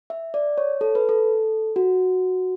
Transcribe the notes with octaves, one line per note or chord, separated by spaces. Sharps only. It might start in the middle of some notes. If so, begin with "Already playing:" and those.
E5
D5
C#5
A4
B4
A4
F#4